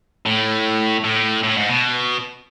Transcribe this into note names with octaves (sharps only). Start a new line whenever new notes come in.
A2
A2
A2
G#2
B2